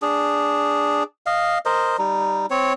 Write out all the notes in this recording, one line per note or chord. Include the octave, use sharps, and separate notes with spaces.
D4 G#4
D#5 F5
A#4 C5 D#5
G3 D#4
C4 C#5